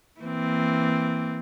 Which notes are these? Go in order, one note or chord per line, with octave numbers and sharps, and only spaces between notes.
E3 A#3 C4